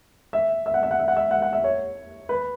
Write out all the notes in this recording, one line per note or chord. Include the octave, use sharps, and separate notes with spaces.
E5
E5
F#5
E5
F#5
E5
F#5
E5
F#5
F#5
E5
C#5
B4